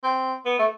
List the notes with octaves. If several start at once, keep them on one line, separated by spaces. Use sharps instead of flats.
C4
B3
A3